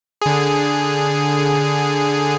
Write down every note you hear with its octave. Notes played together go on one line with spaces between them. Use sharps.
D3 G#4